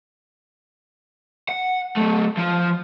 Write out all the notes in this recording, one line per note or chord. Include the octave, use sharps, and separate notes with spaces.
F#5
F#3 A3
F3 F4